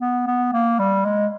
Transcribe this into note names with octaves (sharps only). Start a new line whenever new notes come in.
B3
B3
A#3
G3
G#3